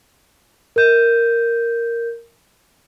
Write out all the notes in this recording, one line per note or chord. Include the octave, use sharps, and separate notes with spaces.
A#4 G6